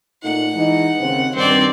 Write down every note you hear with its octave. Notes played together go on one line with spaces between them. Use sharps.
A#2 A3 D#4 F#5
E3 G#3 D#4
D#2 C#3 C4
G2 D#3 C4 D5